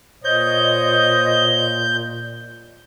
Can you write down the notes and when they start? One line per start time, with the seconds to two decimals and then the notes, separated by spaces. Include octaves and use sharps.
0.24 A#2 C5 C#5 D#5 G6